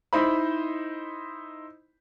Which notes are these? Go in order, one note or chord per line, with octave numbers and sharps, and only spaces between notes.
D#4 E4 C5 B5